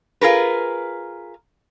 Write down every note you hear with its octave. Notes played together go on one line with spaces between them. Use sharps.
F4 G#4 A#4 B4